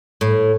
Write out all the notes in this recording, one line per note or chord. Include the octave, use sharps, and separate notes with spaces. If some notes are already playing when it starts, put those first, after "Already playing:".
A2